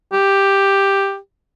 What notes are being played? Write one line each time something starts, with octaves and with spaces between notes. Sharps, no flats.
G4